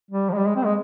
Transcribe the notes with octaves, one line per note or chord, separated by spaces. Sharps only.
G3
F3
G#3
G3
G#3
C4
G#3